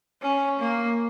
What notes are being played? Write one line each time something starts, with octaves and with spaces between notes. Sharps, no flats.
C#4
A#3